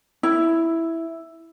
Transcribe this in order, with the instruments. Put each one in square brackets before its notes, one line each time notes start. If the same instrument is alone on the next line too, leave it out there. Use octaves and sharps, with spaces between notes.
[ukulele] E4